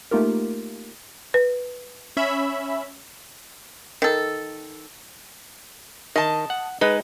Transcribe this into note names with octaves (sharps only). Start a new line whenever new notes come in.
A3 A#3 D#4 F4 G4 A#4
B4
C#4 E5 B5
D#3 A4
D#3 D#5 A5
F#5
G#3 D#4 B4